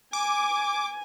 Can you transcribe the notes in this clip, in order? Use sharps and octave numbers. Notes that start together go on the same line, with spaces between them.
G#5 D6